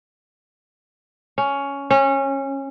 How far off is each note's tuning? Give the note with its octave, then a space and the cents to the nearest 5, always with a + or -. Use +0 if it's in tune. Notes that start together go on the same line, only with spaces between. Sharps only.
C#4 +10
C#4 -20